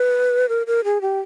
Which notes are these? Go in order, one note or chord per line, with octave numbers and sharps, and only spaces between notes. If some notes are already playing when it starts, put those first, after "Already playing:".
Already playing: B4
A#4
A#4
G#4
G4